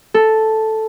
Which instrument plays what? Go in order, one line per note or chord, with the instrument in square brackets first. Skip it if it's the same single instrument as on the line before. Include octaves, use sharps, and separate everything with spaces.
[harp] A4